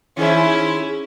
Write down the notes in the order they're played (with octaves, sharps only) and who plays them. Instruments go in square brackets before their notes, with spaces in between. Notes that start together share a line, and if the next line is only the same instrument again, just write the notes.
[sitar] D#3 G#4 C5 [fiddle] C#4 E4